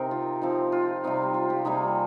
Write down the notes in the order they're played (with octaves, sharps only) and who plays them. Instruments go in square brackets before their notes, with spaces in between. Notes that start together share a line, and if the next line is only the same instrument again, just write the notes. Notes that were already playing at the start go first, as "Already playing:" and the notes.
Already playing: [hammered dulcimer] C3 C4 D#4 A#4
F4
F3 C4 D#4
F4
C3 G3 C4 D#4
F4
G4
C3 G3 A#3 D#4 G#4